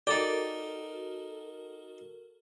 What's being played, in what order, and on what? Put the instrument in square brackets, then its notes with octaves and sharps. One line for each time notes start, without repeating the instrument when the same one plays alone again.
[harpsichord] D#4 G5 [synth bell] F#4 A4 A#4 [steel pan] D5